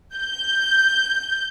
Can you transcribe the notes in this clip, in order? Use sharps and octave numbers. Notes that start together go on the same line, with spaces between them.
G6